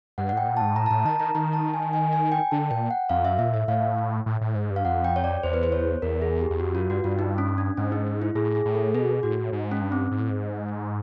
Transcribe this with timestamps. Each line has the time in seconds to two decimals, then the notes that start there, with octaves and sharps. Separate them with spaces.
0.18 G2 F#5
0.29 F#5
0.33 A2 G5
0.47 A#2
0.57 A5
0.61 G#2
0.76 A2 A#5
0.86 A5
0.90 A2 A#5
1.05 D#3 A5
1.20 D#3 A#5
1.35 D#3 A#5
1.53 A5
1.74 G#5
1.93 G#5
2.13 G#5
2.32 G5
2.51 D3 A5
2.71 A#2 G5
2.91 F#5
3.09 F2 F5
3.24 F#2 E5
3.39 A#2 E5
3.54 A2 E5
3.68 A2 F5
4.26 A2
4.41 A2
4.55 G#2
4.70 G2
4.76 F5
4.85 F2 F#5
5.04 G5
5.16 C#5
5.24 D5
5.43 E2 C5
5.54 B4
5.63 C5
5.72 C#5
6.02 E2 A#4
6.22 G#4
6.41 G4
6.50 E2
6.60 F2 F#4
6.75 F#2 F4
6.90 G2 F#4
7.04 G2 F4
7.19 D#4
7.38 C#4
7.58 D4
7.77 G#2 C#4
7.92 D#4
8.22 E4
8.35 A2 G#4
8.55 G#4
8.65 A2
8.75 A4
8.94 B2 G#4
9.23 A2 F#4
9.52 G#2
9.71 C#4
9.82 G2
9.92 C4
10.11 G#2
10.20 A2
10.30 G#2